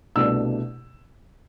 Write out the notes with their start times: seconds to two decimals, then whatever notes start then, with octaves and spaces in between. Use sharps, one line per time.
0.16 C2 B2 A3 D4 E6